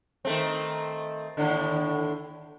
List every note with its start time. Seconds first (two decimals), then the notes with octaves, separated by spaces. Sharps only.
0.25 D#3 A3 C4
1.37 D#2 A2 D3